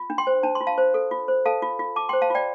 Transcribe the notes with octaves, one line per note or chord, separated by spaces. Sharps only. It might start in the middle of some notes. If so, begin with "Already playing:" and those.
Already playing: F4
D4
G5 C6
C5
D4 A5
C6
F4
F5 A5
C5
A4
F4
C5
A4 F5 A5
F4
F4
F4 A5 D6
C5 G5 C6
F5 A5
F4 D5 G5